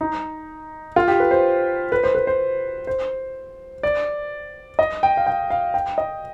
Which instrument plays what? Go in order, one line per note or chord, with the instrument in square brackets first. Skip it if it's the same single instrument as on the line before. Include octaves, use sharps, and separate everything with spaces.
[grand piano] D#4
F4
G4
B4
C5
B4
C5
B4
C5
C5
D5
D#5
G5
F5
G5
F5
G5
D#5